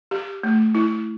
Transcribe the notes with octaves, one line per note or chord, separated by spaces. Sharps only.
G4
A3
E4